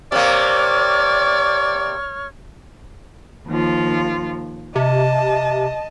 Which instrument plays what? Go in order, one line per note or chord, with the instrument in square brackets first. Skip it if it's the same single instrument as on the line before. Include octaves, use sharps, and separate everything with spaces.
[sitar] C3 A#3 [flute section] C#5 C#6 F6 [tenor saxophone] D5
[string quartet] D#2 F3 F4
[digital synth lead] C3 [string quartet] D#5 A5